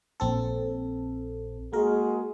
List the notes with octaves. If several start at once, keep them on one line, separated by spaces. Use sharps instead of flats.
A#1 C4 A4
G#3 A#3 F#4 G#4 A#4